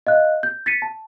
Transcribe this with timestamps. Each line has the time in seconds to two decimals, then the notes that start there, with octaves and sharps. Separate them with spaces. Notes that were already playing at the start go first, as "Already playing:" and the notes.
0.07 D#5 F5 F#6
0.43 G6
0.66 A6 B6 C#7 D#7
0.82 A5